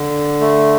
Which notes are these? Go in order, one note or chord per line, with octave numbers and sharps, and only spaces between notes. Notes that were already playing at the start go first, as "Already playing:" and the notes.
Already playing: D3
A3